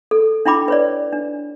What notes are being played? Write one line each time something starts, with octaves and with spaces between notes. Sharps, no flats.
A4
D4 E4 G5 B5 D6
B4 C#5 D5
D4